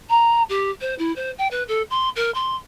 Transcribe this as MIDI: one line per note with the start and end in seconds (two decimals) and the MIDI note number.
0.09 0.43 82
0.49 0.70 67
0.81 0.95 72
0.98 1.14 64
1.16 1.31 72
1.38 1.48 79
1.51 1.63 71
1.68 1.82 69
1.90 2.09 84
2.16 2.31 70
2.34 2.56 84